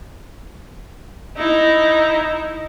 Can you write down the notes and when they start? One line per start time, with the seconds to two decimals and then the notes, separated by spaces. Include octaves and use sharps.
1.37 D#4 E4